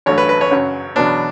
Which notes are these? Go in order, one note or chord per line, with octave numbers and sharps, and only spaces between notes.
A1 G2 F#3 A3 C#5
B4
B4
C#5
F#2 C#3 F#3
E2 B2 F#3 B3 D4